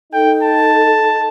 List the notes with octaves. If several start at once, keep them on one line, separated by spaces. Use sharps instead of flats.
D#4 A4 G5
A5